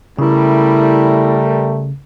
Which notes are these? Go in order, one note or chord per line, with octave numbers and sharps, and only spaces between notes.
C#3 G3 A3 E4 A#4